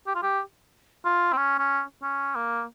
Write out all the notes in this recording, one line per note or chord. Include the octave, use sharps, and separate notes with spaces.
G4
F4
G4
F4
C4
C#4
C#4
C#4
A#3